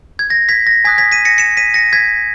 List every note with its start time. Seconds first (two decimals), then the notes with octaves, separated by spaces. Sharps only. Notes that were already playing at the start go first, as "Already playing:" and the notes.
0.19 G#6
0.30 A#6
0.49 G#6 B6
0.67 A#6
0.85 G#5 D#6 F#6 G#6 B6
0.98 G#6 B6
1.12 B6 D#7
1.25 A#6 C#7
1.38 C#7 E7
1.57 B6 D#7
1.74 A#6 C#7
1.93 G#6 B6